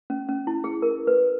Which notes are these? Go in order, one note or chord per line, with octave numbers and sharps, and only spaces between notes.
C#4
C#4
E4
G#4
A#4
B4